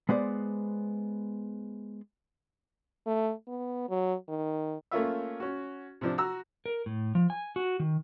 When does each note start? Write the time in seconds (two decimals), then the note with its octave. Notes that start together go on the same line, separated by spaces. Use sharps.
0.09 G#3 B3 C5 D5
3.07 A3
3.48 B3
3.89 F#3
4.29 D#3
4.91 A3 A#3 C#4 F4 E5
5.40 C#4 F#4
6.01 C3 F3 D4
6.18 F#4 A#5 E6
6.66 A#4
6.86 A2
7.15 F3
7.30 G#5
7.56 F#4
7.80 D#3